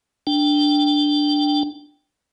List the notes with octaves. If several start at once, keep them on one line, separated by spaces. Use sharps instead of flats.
D4 G5